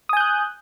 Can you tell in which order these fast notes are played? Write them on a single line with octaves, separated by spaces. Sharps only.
D#6 G#5 G6 F#6